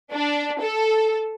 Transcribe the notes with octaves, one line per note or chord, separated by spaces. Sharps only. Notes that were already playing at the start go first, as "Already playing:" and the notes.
D4
A4